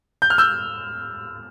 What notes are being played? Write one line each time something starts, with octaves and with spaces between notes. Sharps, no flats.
G6
F6
E6 G6